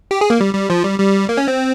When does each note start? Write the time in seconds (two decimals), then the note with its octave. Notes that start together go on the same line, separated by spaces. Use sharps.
0.11 G4
0.21 G#4
0.30 A#3
0.41 G3
0.55 G3
0.70 F3
0.84 G3
1.00 G3
1.29 A#3
1.37 C#4
1.48 C4